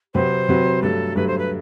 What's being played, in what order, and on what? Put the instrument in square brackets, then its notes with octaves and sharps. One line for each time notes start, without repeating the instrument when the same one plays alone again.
[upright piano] C3 F#3 C4 F#4 B4 [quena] C5
[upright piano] C3 F#3 C4 F#4 B4
[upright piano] G2 F#3 A3 [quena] A4
[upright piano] G2 F#3 A3 [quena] B4
[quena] C5
B4